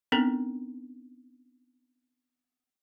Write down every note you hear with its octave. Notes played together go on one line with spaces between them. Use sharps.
B3 C4 D4 D#4 A4 A#4